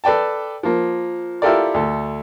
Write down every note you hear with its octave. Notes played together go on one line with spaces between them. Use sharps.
A4 B4 D5 G5 A5
F3 A#3
E4 F4 G4 A4 A#4 D5
D2 A4